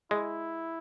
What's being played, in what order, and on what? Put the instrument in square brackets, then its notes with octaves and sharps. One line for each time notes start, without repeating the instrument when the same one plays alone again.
[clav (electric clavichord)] G#3 [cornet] E4